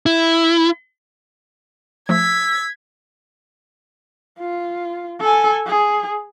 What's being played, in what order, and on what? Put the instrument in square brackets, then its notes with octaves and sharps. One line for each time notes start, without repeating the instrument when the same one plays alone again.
[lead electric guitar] E4
[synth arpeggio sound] F3 A3 [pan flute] E6 [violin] G#6 B6
[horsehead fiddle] F4
A4 G#5
G#4